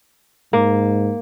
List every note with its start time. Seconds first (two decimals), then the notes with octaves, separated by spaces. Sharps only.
0.53 G#2 A#3